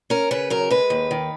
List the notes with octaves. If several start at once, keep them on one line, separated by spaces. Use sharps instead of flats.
C#4 A#4
C#3 B4
F#3 A#4
G#3 B4
D#2
D#3